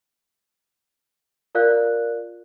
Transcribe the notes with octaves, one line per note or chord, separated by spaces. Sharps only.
F4 A#4 D5 F5 F#6